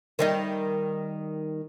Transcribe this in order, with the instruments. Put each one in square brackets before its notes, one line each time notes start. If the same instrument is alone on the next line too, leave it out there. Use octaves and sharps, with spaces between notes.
[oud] D#3 G3 D#4